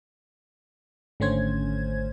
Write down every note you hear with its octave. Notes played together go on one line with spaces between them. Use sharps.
G#1 D3 A3 C#4 C5 G#6